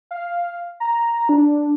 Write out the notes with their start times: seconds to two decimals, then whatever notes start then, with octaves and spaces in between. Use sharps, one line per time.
0.11 F5
0.80 A#5
1.29 D4